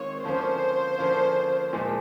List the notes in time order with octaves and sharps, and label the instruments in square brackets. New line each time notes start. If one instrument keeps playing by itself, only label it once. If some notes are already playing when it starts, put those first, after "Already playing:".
Already playing: [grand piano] D#3 G#3 C4 F4 [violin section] C#5
[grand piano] D3 F3 A#3 C#4 F4 [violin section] C5
[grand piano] D3 F3 A#3 C#4 F4
A#2 F3 G#3